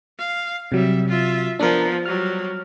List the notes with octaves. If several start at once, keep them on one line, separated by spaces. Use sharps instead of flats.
F5
C3 F#3 G3 E5
F4 E5
F3 B3 D4 A#4
F#3 G3 F6